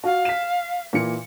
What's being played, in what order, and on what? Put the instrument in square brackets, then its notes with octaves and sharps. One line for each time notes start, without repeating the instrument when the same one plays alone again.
[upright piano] F#4 [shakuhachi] F5
[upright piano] B6 E7
A#2 E3 C#7